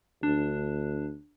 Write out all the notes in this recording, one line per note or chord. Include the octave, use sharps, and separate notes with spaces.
D2 D4